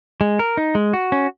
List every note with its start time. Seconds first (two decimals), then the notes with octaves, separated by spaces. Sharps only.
0.21 G#3
0.39 A#4
0.57 D#4
0.75 G#3
0.93 F#4
1.12 C#4